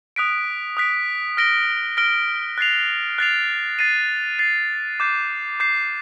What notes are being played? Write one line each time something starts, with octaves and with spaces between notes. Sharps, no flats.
D#6 F#6 B6 D7
D#6 F#6 B6 D7
F6 A#6 D7 G7
F6 A#6 D7 G7
F#6 A6 C7 F7
F#6 A6 C7 F7
A6 C7 D#7
A6 C7 D#7
D6 G6 C7
D6 G6 C7